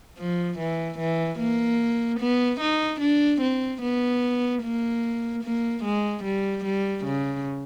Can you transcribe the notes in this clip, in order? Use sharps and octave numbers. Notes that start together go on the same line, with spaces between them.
F3
E3
E3
A#3
B3
D#4
D4
C4
B3
A#3
A#3
G#3
G3
G3
C#3